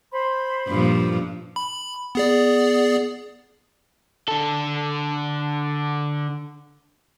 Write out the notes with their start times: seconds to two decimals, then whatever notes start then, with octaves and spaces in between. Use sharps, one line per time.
0.13 C5 B5 C6
0.68 G2 A#2 F3
1.56 B5
2.15 B3 G#4 D5
4.28 D3 A4